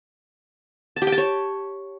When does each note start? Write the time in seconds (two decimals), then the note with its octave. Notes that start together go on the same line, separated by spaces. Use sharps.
0.96 A5
1.02 G4
1.07 G5
1.12 A5
1.18 C#5